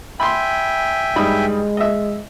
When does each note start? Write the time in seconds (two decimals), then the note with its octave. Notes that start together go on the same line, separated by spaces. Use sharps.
0.20 E5 G5 G#5 B5 C6
1.16 G2 G#3 D#4 B5
1.77 D#5 E5